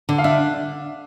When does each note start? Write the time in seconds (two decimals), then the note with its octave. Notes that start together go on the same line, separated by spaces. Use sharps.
0.09 D3
0.18 F5
0.24 D4 E5